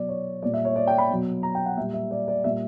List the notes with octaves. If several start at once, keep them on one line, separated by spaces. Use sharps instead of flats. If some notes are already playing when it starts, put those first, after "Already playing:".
Already playing: B2 F#3 D5
C#5
A#2 G3 D5
E5
C#5
D5
G5
B5
B2 F#3
A#5
G5
F#5
A#2 G3 E5
E5
D5
D5
A#2 G3 E5